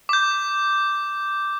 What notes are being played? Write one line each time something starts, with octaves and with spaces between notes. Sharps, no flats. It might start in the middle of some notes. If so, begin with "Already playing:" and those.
D6 G6